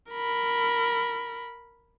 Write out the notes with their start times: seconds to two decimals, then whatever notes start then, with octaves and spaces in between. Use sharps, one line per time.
0.11 A#4 B5